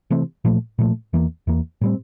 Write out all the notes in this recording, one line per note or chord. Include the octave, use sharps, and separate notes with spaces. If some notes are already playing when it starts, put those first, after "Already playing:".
C3 E3 A3 C4
A#2 F3 A3
A#2 F3 A3
E2 E3 A#3
E2 E3 A#3
A2 G3 C4